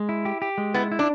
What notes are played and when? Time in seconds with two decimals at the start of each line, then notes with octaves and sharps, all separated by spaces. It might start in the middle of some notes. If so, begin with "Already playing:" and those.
Already playing: G#3
0.09 E4
0.25 G4
0.42 G4
0.58 G#3
0.74 B3 E4
0.92 E4
0.99 D4